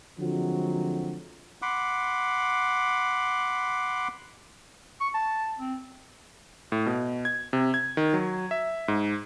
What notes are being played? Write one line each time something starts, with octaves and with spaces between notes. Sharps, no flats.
D3 F3 F#3 G#3 C4 F#4
F#5 B5 C6 D6
C#6
A5
C4
A2
B2
G#6
C3
G#6
D#3
F#3
E5
G#2